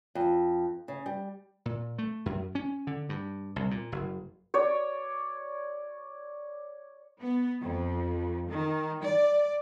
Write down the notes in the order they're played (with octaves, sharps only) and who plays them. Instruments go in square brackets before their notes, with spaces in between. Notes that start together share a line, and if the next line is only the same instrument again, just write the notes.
[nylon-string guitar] F2
C#3
G3
[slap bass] A#2
A3
F#2
C#4
D3
G2
C2
A#2
F#1
[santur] C#5 D5
[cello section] B3
F2
D#3
D5